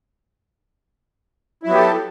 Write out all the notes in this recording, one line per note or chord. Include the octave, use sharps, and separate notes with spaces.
F#3 B3 E4 G4 A4